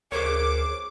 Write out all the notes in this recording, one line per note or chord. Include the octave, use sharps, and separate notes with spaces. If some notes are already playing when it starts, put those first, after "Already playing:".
D2 G#4 A#4 C5 C#5 D6